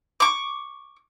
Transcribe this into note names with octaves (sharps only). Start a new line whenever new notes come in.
C#6 D6